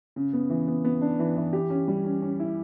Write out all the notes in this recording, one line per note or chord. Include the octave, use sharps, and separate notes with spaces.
C#3
B3
E3
B3
B3
D4
E3
E3
G4
C#4
G3
C#4
C#4
E4